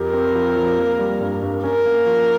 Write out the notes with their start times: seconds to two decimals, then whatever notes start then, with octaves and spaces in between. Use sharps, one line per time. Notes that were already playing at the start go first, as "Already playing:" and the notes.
Already playing: F2 G4 A#4
0.13 C4
0.35 F3
0.56 F3
0.78 A#3
0.99 G3
1.21 G2
1.42 G2
1.64 C#4 A#4
1.86 A#3
2.06 F3